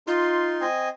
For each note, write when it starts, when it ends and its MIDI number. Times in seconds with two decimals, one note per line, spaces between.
0.07 0.64 63
0.07 0.66 65
0.07 0.64 84
0.61 0.89 60
0.61 0.89 75
0.61 0.89 80